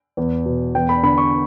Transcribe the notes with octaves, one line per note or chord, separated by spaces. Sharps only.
E2
B2
E2 G5
B5
D3 B5
C#6